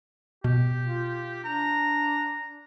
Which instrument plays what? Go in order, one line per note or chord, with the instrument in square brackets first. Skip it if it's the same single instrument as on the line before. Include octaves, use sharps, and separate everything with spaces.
[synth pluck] B2 [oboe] G4
[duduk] F4
[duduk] D4 [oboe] A#5